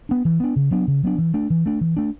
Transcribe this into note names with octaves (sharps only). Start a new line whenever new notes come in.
B3 D4
E3
B3 D4
C#3
F#3 B3 D4
C#3
F#3 B3 D4
E3
A3 D4
E3
A3 D4
E3
A3 D4